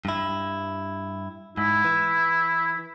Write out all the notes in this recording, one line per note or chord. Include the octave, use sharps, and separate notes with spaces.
G2 E4
G#2 E4
E3